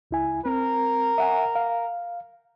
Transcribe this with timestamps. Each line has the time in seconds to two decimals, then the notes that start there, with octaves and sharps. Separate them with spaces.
0.11 C#2 E4 G#5
0.46 C4 A#4
1.18 E5 F#5 G#5
1.55 F5